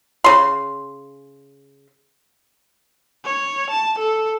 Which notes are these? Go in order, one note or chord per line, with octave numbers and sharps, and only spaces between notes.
C#3 C6
C#5
A5
A4